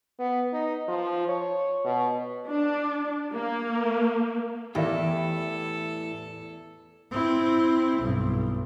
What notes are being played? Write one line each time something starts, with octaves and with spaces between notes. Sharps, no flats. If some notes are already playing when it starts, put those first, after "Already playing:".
B3
D#4
F3
C#5
B2
D4
A#3
E2 A2 E3 E4 G4 A4 D5 E5
C4 E4
B1 G2